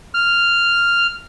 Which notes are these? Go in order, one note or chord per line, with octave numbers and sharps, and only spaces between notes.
F6